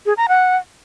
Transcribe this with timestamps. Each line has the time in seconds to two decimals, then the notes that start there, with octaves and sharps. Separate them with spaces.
0.06 G#4
0.17 A#5
0.28 F#5